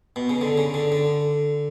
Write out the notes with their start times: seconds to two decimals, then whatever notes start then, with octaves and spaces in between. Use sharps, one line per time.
0.16 B2
0.29 C#3
0.41 D3
0.58 C#3
0.74 D3
0.92 D3